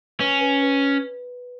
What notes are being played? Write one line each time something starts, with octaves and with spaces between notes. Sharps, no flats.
C#4 B4
B4
B4